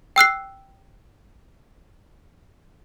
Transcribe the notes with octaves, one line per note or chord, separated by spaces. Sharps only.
G5 E6 F#6 C7